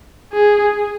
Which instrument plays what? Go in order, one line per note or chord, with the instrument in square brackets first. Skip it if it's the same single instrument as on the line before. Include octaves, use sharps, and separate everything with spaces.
[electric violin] G#4